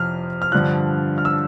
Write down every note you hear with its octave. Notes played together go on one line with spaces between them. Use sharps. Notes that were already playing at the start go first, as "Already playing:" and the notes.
Already playing: F2 C3 F3 F6
F6
G2 D3 F3 F#6
F6
E6